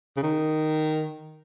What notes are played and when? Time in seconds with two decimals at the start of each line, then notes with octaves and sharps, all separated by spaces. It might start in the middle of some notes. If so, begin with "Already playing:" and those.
0.17 C#3
0.23 D#3